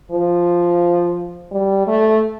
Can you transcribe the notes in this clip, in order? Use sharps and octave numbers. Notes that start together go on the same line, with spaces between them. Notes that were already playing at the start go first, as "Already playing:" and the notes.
F3
G3
A3